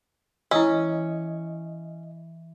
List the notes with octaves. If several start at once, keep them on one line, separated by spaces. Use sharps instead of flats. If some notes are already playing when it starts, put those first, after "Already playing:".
E3 C#4 E4 D#5 E6